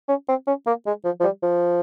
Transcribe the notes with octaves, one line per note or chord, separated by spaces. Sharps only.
C#4
C4
C#4
A#3
G#3
F3
F3
G3
F3